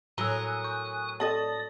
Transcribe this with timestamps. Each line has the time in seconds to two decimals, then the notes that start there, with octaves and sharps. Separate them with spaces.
0.18 A2 F#3 A#4 G#5 A#5 D#6 E6 F#6
0.64 C#6
1.20 C4 A4 D5 D#5 A5 D#6 A#6